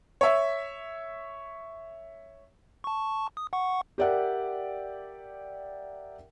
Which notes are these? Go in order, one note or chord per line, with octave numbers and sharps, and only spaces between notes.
C#5 E5
A5 C#6
D#6
F#5 C#6
G4 A#4 D5 E5 F#5 G5